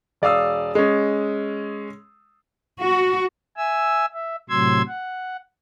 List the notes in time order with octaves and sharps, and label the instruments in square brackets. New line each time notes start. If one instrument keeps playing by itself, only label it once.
[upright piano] E1 D5 F5 D#6 E6
G#3 C#4
[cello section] F#4
[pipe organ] E5 G#5 E6
E5
A2 C3 F#3 C6 E6 G#6
F#5